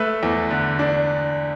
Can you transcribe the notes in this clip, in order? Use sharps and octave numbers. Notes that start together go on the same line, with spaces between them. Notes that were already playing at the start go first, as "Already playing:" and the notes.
Already playing: A3 B4 E5
E2
D3
D4